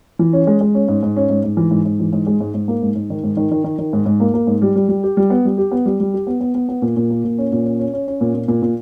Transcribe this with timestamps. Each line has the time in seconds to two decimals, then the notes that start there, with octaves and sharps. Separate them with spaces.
0.19 E3
0.33 C#4
0.47 G#3
0.61 G#3
0.75 C#4
0.88 G#2
1.03 G#2
1.16 C#4
1.30 G#2
1.44 G#2
1.57 E3
1.71 G#2
1.85 G#2
2.00 E3
2.13 G#2
2.27 G#3
2.40 G#2
2.54 G#2
2.68 A#3
2.82 G#2
2.95 G#2
3.10 D#3
3.24 G#2
3.37 D#3
3.51 D#3
3.64 D#3
3.79 D#3
3.93 G#2
4.06 G#2
4.20 A#3
4.34 A#3
4.47 G#2
4.62 G3
4.75 G3
4.89 G3
5.03 G4
5.17 G3
5.30 B3
5.45 G3
5.58 G4
5.71 B3
5.86 G3
6.00 G3
6.14 G4
6.27 B3
6.41 B3
6.55 B3
6.69 B3
6.82 A#2
6.97 A#2
7.10 A#3
7.24 A#2
7.38 C#4
7.52 A#2
7.65 C#4
7.79 C#4
7.93 C#4
8.08 C#4
8.21 A#2
8.35 A#2
8.48 A#2
8.62 A#2